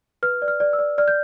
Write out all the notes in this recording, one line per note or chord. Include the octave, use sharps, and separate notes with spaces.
B4 F6
D5
F6
D5
E6
D5
D5 F6
G6